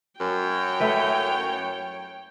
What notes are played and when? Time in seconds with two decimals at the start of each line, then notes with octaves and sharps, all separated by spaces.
0.20 F#2 C#5 G5
0.80 A3 E4 B4